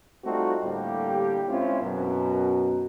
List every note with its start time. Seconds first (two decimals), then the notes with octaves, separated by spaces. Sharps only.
0.25 G3 A3 C4 D#4 F4 F#4
0.64 A2 D3 G3 A#3 G4
1.49 G#3 C4 C#4 E4 F4
1.81 F#2 B2 A#4